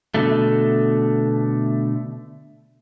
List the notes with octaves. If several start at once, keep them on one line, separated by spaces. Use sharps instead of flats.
B2 D3 A3